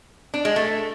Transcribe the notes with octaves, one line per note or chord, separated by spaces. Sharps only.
D4
G#3
A3